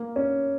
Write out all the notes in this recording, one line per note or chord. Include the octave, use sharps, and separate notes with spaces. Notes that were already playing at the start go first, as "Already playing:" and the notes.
Already playing: A#3
C#4